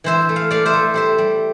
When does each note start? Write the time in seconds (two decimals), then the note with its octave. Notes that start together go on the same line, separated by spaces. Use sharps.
0.04 E3 C5 E5
0.29 A3
0.36 F5
0.51 A3 D5 F5
0.65 C5 E5
0.73 A3
0.94 G3 C5 E5
1.18 G3